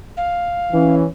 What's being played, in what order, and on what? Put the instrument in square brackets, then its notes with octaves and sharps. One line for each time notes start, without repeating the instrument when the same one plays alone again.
[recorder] F5
[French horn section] E3 C#4